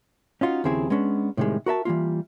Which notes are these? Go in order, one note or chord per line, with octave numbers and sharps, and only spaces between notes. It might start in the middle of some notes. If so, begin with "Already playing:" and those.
C#4 D#4 F4 F#4
D#2 C#3 F3 C4 E4 G#4
G#3 B3 C#4 D4
A2 C3 D#3 G3 G#3
F#4 A#4 E5 A5
E3 G3 A#3 F4